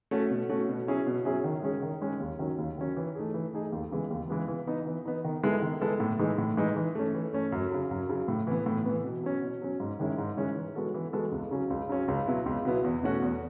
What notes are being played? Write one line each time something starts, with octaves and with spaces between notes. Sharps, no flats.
A3 C#4 F#4
B2
A3 C#4 F#4
B2
F#3 C#4 E4 G#4
B2
F#3 C#4 E4 G#4
D#3
G#3 C#4 G#4
D#3
G#3 C#4 G#4
D#2
D#3 F#3 C#4
D#2
D#3 F#3 C#4
E3
A3 D#4 G#4
E3
A3 D#4 G#4
D#2
C#3 E3 G#3 B3
D#2
C#3 E3 G#3 B3
E3
B3 D#4
E3
B3 D#4
D#3
G#3 B3 E4 A4
D#3
G#3 B3 E4 A4
A2
E3 G#3 D#4
A2
E3 G#3 D#4
E3
A3 C#4
E3
A3 C#4
F#2
C#3 F#3
F#2
C#3 F#3
A2
E3 B3
A2
E3 B3
B2
F#3 C#4
B2
F#3 C#4
G#2
D#3 G#3 C#4 E4
G#2
D#3 G#3 C#4 E4
E3
G#3 B3 F#4 A4
E3
G#3 B3 F#4 A4
C#2
C#3 F#3 C#4
C#2
C#3 F#3 C#4
C#2
B2 F#3 B3 E4
C#2
B2 F#3 B3 E4
E2
B2 A3 C#4 F#4
E2